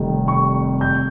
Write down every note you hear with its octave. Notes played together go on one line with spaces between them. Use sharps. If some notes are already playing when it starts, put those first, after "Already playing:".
Already playing: F1 F2 D#3 G3
C#6
G6